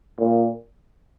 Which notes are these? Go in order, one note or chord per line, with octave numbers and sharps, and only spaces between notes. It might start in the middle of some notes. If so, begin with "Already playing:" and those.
A#2